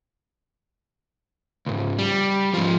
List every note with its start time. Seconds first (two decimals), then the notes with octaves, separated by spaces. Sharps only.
1.66 C#2 G#2
1.99 G3
2.54 G#2 F3